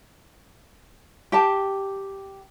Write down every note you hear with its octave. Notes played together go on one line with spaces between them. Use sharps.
G4 G5 A5